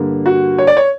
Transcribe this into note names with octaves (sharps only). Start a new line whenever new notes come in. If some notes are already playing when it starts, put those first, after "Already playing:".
Already playing: G2 D3 A#3
F#4
C#5
D5
C#5